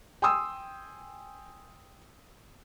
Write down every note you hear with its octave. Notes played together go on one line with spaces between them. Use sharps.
G5 G#5 C6 D#6 E6